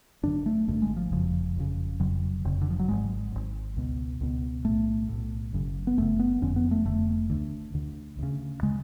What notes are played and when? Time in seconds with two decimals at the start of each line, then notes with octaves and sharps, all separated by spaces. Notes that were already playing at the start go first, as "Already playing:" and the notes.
0.23 G#1 F#2 D3 D4
0.46 A3
0.68 G#1 F#2 D3 A3
0.82 G#3
0.97 F3
1.12 F#1 F2 C#3 F3
1.56 F#1 F2 C#3
2.00 F1 F2 C#3 F#3
2.45 F1 F2 C#3
2.62 D3
2.71 F3
2.80 F#3
2.88 G#1 G#2 G#3
3.32 G#1 G#2
3.76 C#2 B2
4.21 C#2 B2
4.65 B1 A2 A3
5.09 B1 A2
5.53 F#1 F#2 C#3
5.87 B3
5.97 F#1 F#2 C#3 A3
6.19 B3
6.42 F1 F2 D3 C#4
6.56 B3
6.71 A3
6.85 F1 F2 D3 A3
7.30 D2 D3
7.74 D2 D3
8.19 D2 C#3
8.63 C#3 G#3